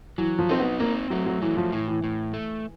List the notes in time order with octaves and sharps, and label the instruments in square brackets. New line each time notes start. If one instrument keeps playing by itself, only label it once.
[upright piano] E3 [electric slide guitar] F#3
[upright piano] F3
[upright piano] C4 [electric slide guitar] D#4
[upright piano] B3
[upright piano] A#3 [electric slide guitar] C4
[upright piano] F#3 [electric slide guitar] A3
[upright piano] F#3
[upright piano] E3 [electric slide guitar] F#3
[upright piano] F3
[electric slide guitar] A2 [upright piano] E3
[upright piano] E3
[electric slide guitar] A2
A3